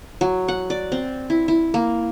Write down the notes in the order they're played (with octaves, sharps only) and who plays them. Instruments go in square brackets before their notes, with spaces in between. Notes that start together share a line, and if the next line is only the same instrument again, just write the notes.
[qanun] F#3
F#5
D5
C4
E4
E4
A#3